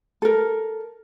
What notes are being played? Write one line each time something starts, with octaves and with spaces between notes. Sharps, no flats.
A4 A#4